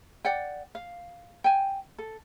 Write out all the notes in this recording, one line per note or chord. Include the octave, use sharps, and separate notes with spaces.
D5 F#5 G5
F5
G5 G#5
A4